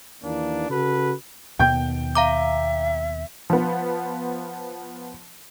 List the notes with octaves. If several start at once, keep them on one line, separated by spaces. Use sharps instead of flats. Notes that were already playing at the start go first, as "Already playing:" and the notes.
D#2 E3 A#3 D4
C#3 F#4 A4 B4
D#2 B2 B3 G5 G6
E5 F5 A#5 D6
F3 B3